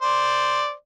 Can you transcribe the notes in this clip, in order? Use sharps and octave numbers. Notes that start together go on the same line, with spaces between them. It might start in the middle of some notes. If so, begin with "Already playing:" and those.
C5 D5